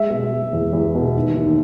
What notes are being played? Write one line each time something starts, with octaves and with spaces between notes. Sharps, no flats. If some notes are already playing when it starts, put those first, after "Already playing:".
Already playing: G#3 E5
B2
G#3
E2
E2
B2
D#2
D#2